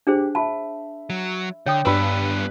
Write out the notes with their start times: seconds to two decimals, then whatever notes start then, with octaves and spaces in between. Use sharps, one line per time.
0.07 D4 G4 G#4 C5
0.35 E5 A5 B5
1.10 F#3
1.66 D3 C#5 G5 D#6
1.85 G2 B3 D4 B4 B5 E6